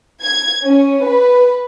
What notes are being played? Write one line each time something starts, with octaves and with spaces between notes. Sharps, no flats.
G#6
C#4
B4